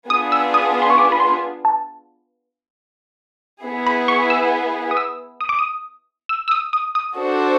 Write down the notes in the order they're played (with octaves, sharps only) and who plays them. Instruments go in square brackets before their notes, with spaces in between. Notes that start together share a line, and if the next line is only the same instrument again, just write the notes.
[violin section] B3 D4 F4 G#4 [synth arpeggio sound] D#6
[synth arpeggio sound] E6
D#6
C6
C#6
D6
B5
C6
A5
[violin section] B3 E4 G#4
[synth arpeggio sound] B5
C#6
E6
D#6
E6
D#6
D6
D#6
E6
E6
D#6
D#6
D#6
[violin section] D4 F#4 A4 C5